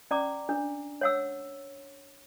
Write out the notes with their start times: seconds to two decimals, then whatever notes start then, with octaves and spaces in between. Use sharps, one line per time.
0.11 C#4 D5 A#5 D6
0.49 D4
1.01 C#5 F#5 E6